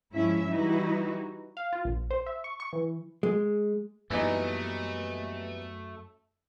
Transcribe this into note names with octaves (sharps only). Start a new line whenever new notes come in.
G#2 F3 C#4 E4 E5
E3 G3 D#4 E4 F#4
F5
F4
A#1
C5
E5
C#6
C#6
E3
G#3
F#2 A#2 E3 G3 A3 B3 D4 D#4